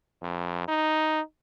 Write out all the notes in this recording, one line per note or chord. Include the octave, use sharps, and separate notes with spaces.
F2
D#4